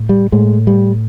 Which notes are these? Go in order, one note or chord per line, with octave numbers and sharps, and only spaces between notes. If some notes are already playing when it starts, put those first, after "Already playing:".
Already playing: A2
G3
A2 G#3
G3